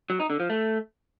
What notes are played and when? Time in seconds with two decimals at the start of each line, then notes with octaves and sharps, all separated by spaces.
0.10 F#3
0.20 D#4
0.30 D3
0.40 F3
0.50 A3